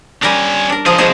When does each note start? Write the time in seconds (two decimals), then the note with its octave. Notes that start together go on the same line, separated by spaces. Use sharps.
0.23 G3 C#4 D4 A#4 G#5
0.69 D4 A#4
0.86 C#2 F3 G#4 A#4 D#5
0.98 C2 B2 G#4 C5 D#5